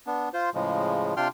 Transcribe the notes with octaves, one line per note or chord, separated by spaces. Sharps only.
B3 D4
F4 C5
A2 C#3 F3 G#3
C3 D4 F4 G5 C6 F6